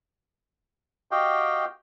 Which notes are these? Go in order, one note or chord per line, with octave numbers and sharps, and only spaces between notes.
F#4 G4 D#5 F5 G5